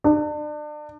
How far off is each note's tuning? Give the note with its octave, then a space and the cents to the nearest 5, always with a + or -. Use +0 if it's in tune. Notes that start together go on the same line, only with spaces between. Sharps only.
D4 +35